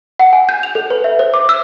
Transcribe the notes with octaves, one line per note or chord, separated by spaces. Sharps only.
F#5
G#5
G6
F7
A4
B4
E5
C5
D6
E6